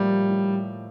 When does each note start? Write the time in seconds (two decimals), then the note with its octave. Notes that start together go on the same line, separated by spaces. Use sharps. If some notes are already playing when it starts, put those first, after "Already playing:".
Already playing: A2 F3 G3 A#3
0.30 A2